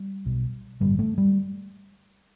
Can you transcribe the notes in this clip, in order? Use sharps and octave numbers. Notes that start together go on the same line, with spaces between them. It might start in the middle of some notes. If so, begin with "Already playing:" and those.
Already playing: G3
B1 B2
A1 G2 D3 G3
A3
G3